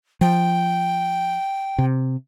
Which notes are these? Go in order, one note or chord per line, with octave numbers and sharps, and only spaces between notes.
F3 G5
C3